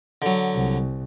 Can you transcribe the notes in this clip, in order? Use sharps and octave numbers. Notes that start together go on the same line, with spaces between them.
D3 F#3
C2